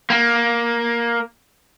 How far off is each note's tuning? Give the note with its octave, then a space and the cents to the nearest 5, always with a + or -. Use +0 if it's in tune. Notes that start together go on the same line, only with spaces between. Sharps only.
A#3 +10